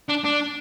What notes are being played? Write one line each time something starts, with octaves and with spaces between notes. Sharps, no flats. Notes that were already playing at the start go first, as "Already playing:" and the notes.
D4
D4